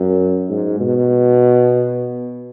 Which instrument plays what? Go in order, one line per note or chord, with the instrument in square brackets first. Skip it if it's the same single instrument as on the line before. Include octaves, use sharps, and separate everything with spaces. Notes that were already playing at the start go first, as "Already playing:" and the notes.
Already playing: [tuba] F#2
G#2
B2